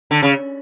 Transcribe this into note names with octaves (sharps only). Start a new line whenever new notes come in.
D3
C#3